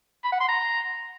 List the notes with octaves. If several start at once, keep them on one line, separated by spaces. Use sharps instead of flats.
B5
F#5
C6
A#5